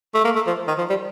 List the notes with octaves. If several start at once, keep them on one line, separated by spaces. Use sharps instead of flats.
A3
A#3
A3
F3
D#3
F3
G3